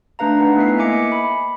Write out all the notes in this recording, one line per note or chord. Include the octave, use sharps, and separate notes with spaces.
A3 D4 B4 F5 A#5
D#4 B4 F#5
A3 B3 E4 E5 G#5 C7
A#3 D#5 E5 G#5 D6 C#7
B5